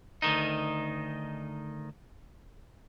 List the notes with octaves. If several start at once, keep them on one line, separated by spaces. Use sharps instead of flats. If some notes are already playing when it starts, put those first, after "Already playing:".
D2 D#3 D#4